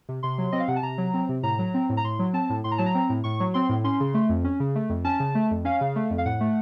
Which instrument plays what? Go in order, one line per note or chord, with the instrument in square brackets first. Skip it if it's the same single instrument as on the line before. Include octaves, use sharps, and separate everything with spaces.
[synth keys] C3
C3 C6
F#3
C4 D#5
F5
C3 F#5
A5
C3 A#5
F#3
C4
C3
A2 A#5
F#3
C4
A2
A#5
A2 C6
F#3
C4 A5
A2
A2 C6
A#5
F#3 A5
A#5
C4
A2
A2 C#6
F#3
C4 C6
A2
C#4 C6
C#3
A3
F2
C#4
C#3
A3
F2
C#4 A5
C#3
A3
F2
C#4 F5
C#3
A3
F2
F5
A2 F#5
A3